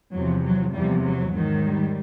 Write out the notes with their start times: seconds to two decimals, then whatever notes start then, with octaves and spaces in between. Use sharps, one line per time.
0.12 E2 C3 F3 F#3
0.43 F#3
0.73 E2 C3 F3 G3
1.03 F#3
1.34 G#2 D#3 F#3
1.64 G3